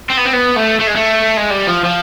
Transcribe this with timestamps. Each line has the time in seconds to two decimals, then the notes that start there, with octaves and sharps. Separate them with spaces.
0.10 C4
0.17 B3
0.25 C4
0.33 B3
0.56 A3
0.80 A3
0.87 G#3
0.96 A3
1.37 G#3
1.50 G3
1.67 F3
1.85 F3